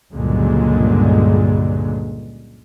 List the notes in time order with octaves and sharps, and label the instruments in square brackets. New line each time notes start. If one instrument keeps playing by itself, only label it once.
[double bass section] C#2 G2 A#2 D3 F#3 G#3